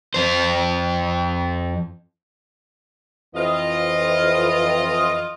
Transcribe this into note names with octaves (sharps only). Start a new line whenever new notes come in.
F2 C5
F2 E3 F4 D#5